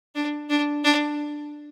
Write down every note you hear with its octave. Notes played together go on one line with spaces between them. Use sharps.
D4
D4
D4